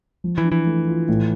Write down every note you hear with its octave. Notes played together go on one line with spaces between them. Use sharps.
F3
E3
D4
E3
A3
F4
A2